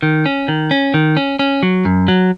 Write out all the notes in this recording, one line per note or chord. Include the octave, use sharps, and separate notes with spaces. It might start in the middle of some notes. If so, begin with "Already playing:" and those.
D#3
C#4
D#3
C#4
D#3
C#4
C#4
F#3
F#2
F#3